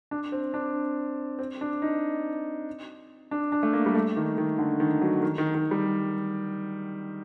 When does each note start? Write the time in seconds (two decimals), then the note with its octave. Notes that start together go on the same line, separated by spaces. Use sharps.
0.11 D4
0.32 C4
0.54 D4
1.39 C4
1.61 D4
1.82 D#4
3.31 D4
3.52 D4
3.63 A3
3.73 A#3
3.86 G3
3.95 A3
4.16 D#3
4.38 D#3
4.59 D3
4.80 D#3
5.01 F#3
5.23 D#3
5.38 D#3
5.55 D#3
5.71 G3